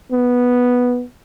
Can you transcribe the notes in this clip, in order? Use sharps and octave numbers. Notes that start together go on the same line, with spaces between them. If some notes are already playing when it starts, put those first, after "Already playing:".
B3